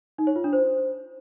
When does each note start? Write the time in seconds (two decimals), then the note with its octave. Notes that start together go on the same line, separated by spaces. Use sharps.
0.18 D#4
0.27 C#5
0.36 F4
0.44 D4
0.53 C5